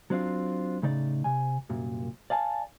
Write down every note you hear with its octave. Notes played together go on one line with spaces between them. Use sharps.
F#3 C4 D4 F4
A2 C#3 D#4 D5
C3 G#5
C2 F#2 A#2
D5 F5 G#5 A5